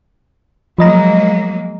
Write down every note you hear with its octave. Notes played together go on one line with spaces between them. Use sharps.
F3 F#3 G#3 A#3 D#5 A#5